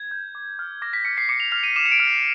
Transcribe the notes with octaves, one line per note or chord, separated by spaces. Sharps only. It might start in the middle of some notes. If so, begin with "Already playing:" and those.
Already playing: G#6
G6
D6
F6
D6 A#6
B6
F6 C#7
C7
D6 C#7
F7
F6 F7
D#7
D6 E7
C#7
D7
F6
C7